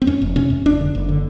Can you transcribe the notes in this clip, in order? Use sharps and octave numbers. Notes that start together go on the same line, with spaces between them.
C4
F2 C#4
F1
C3 C#4
F2
F#1 D4
D3
F#1
D3